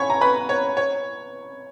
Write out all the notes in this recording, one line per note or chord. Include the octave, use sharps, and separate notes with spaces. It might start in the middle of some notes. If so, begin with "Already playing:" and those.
Already playing: C#5 G#5 B5 C#6
A#5
B4 B5
C#5
C#5